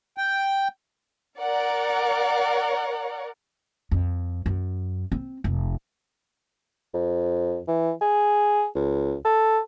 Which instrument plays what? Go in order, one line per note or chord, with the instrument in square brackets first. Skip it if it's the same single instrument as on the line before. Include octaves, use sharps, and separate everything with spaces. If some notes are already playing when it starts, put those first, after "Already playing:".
[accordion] G5
[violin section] A#4 D5 F#5
[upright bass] F2
F#2
C4
F1
[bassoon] F2
E3
G#4
C#2
A4